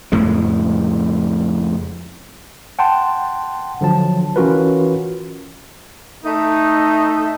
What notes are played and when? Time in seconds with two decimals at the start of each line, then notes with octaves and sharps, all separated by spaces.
0.12 F2 A2 C#3 G#3
2.79 F#5 G5 A5 C6
3.81 D3 F3 F#3 A5
4.36 E3 C#4 F4 F#4 A#4 B4
6.25 A3 D#4